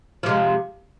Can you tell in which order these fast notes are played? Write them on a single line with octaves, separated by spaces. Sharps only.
F3 C3 G#3